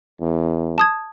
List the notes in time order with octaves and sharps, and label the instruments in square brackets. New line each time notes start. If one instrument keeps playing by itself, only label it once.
[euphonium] E2
[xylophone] A5 D#6 G#6